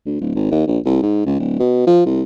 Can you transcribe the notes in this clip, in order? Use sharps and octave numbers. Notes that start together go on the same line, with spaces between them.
D2
D1
G#1
D#2
A#1
C2
G#2
C#2
D1
B2
F3
C2